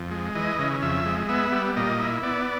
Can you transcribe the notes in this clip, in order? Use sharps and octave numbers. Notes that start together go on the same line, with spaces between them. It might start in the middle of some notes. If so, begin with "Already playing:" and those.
Already playing: F2
G#3
E3 D#5
C#3
F2 E5
G#3
B3 E5
G3
A#2 D#5
E4
B3 D5